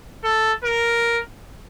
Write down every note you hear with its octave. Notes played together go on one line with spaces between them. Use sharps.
A4
A#4